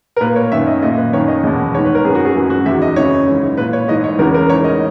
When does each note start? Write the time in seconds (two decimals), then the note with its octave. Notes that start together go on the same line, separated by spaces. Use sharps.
0.16 A#4
0.21 A#2 B4
0.36 C#5
0.52 F#2 D#3 E5
0.67 D#5
0.82 A#2 D#5
0.97 B4
1.13 F#2 D#3 C#5
1.28 D#5
1.43 E2 B2
1.74 G#2 D#3 C#5
1.85 B4
1.95 A#4
2.05 F#2 D#3 G#4
2.15 F#4
2.25 G#4
2.35 F#2 E3
2.50 F#4
2.66 E2 D#3 E5
2.82 D#5
2.96 F#2 C#3 E3 C#5
3.27 G#2 E3
3.57 A#2 B4
3.73 C#5
3.88 G#2 E3 D#5
4.04 C#5
4.19 E2 C#3 E3 A#4
4.34 A#4
4.49 G#2 E3 C#5
4.64 D#5